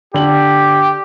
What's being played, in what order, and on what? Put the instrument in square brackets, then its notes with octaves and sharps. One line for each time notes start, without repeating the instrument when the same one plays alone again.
[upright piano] D3 F#7 [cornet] G4